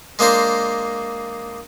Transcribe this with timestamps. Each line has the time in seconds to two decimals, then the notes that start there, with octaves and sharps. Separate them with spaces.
0.19 G#3 A#3 D4 C5